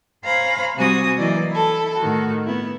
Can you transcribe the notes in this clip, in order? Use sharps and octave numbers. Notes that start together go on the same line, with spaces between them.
C5 C#5 F5 G#5 A#5 B5
C3 G3 F#4 C5 G#5 D#6
E3 F#3 A#3 E4 D5 D#5
E4 A4
A2 D#3 F#4
B3 E4